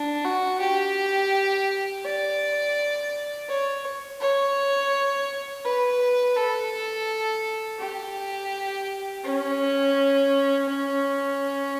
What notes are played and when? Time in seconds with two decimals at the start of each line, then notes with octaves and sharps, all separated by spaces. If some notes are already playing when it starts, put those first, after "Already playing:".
Already playing: D4
0.25 F#4
0.61 G4
2.05 D5
3.48 C#5
4.21 C#5
5.64 B4
6.36 A4
7.80 G4
9.24 C#4
10.68 C#4